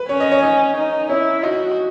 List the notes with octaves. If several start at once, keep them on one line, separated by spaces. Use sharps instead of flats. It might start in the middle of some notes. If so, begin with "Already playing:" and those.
Already playing: B4
C#4 C#5
D#5
C#5
D#4
D#4
C#4 E4
D#4 F#4